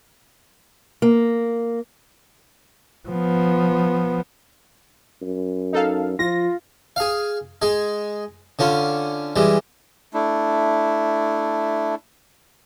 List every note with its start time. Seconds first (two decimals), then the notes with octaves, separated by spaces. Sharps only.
1.02 A#3
3.09 F3 B3
5.22 F#2
5.73 D#4 A4 F5
6.19 F3 F4 A#6
6.96 G#4 F5
7.62 G#3 G#4
8.59 D3 C#4 F4
9.36 E3 G3 G#3
10.14 A3 D4 E4